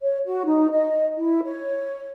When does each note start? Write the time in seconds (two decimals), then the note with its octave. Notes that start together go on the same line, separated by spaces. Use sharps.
0.02 C#5
0.26 F#4
0.45 D#4
0.71 D#5
1.17 E4
1.43 C#5